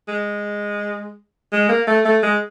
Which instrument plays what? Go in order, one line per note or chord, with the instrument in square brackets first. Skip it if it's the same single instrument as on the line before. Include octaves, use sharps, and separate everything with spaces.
[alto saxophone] G#3
G#3
A#3
A3
A3
G#3